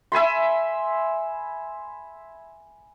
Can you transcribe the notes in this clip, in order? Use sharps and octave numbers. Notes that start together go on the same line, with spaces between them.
E5 G#5 B5 C6